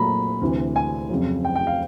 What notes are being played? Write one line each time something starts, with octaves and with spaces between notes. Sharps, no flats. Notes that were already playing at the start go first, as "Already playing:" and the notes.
Already playing: A#2 F#3 A3 A#5 B5
D2 C3 E3
G#5
F2 C#3 F#3
G5
G5
F5